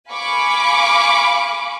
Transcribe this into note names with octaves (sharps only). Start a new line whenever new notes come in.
F5 G#5 B5 C#6 D6